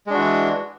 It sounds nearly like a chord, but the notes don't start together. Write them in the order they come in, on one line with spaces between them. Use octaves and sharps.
G#3 D4 F#4 E3